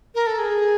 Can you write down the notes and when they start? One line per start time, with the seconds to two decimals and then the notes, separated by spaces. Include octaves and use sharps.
0.15 A#4
0.27 A4
0.39 G#4